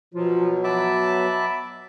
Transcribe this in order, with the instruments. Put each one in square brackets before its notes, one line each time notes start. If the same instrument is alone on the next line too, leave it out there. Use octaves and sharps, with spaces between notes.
[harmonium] B2 F#3 [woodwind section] F3 [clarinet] F4
[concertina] E5 A5 D6 [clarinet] F#5 [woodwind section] B5